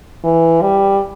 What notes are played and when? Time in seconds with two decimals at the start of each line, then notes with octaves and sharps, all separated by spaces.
0.24 E3
0.62 G3